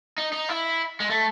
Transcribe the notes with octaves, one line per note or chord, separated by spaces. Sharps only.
D#4
D#4
E4
G#3
A3